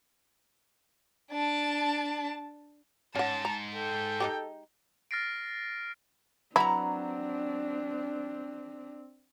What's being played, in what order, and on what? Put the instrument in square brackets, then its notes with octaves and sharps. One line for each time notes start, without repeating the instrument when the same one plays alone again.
[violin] D4 A5
[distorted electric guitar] G#2 [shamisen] C#4 F#5 [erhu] A5
[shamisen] A#5
[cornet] A4 [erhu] G5
[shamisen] G#3 D#4 G4
[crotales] F6 A6 A#6 C7 D7
[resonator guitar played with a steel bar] F#3 B4 A#5 [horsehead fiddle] C4 D4 [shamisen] E4